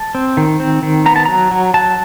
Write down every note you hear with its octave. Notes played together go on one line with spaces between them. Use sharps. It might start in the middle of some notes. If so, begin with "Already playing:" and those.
Already playing: A5
C4
D#3
C4
D#3
B3 A#5
A5
F#3 A#5
F#3
F#3 A5